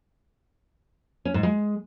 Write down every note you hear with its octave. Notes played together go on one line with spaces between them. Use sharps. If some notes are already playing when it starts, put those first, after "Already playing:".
C#4
G#2
G#3